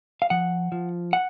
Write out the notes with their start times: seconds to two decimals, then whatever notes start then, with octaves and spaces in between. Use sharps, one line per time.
0.22 F5
0.30 F3 F#5
0.72 F3
1.13 F#5